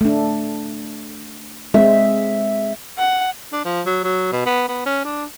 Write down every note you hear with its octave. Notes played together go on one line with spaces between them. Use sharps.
A3 D4
G#3 C4 E5
F#5
D4
F3
F#3
F#3
B2
B3
B3
C#4
D4